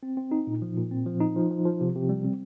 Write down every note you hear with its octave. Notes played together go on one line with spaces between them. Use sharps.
C4
C4
D#4
A#2
F3
A#2
C4
F3
D#4
F3
F3
F3
C3
C3
G3
C4